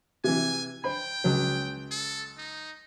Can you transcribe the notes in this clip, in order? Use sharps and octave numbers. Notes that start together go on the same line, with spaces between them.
C3 E3 G#5
C5 G5 B5
C#2 F#3
A4
D#4